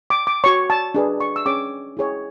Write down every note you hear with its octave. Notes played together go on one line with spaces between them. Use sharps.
D6
D6
F#4 C#5 C#6
A5
D4 G#4 B4
C#6
E6
C#4 G#4 C#5 D6
E4 G#4 C#5